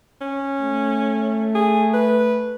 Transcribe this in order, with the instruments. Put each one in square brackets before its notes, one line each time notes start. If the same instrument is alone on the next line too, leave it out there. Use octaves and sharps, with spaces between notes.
[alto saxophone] C#4
[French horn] A3
[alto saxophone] G#4
B4